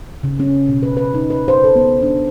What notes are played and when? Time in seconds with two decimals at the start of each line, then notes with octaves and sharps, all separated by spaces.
0.23 C#3
0.40 C#4
0.69 B2
0.83 B4
0.97 B4
1.14 D#4
1.30 B4
1.48 C5
1.64 A4
1.76 B3
2.02 D4